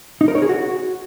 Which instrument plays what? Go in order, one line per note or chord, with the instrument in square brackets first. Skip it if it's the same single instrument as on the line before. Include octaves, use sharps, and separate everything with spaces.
[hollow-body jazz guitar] D#4
A#4
C#5
G#4
F#4